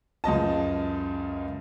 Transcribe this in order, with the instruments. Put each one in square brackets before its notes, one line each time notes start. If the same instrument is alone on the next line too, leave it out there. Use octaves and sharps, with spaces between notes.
[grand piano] C#2 F#2 D#5 A5